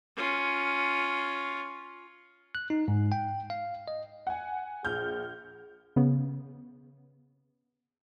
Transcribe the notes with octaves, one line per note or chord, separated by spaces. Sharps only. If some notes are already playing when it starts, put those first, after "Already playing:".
C#4 F4
F#6
D#4
G#2
G5
F5
D#5
F#5 G#5
A#1 G#4 F6 G6
C#3 B3